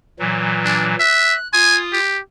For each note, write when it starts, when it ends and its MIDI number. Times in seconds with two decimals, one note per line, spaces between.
0.19 0.96 46
0.19 0.96 52
0.19 0.96 54
0.65 0.87 62
1.00 1.35 76
1.00 1.48 90
1.53 1.99 65
1.53 1.78 80
1.53 1.99 87
1.93 2.19 67